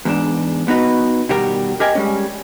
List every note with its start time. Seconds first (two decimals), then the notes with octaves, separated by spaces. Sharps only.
0.05 E2 G#2 D4
0.68 B3 D#4 F#4 B4
1.29 B2 D#3 G3 F#4 G4 A#4
1.80 G4 A#4 D#5 G5 G#5
1.95 G3 G#3 C#4